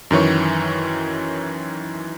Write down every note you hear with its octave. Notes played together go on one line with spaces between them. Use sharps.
F#2 D#3 E3 C#5